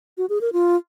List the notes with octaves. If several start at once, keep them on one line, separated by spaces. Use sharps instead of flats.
F#4
G#4
A#4
F4